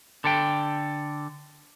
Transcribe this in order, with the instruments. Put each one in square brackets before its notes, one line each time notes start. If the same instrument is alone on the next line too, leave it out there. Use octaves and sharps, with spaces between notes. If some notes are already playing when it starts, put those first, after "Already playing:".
[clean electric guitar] D3 A4 G5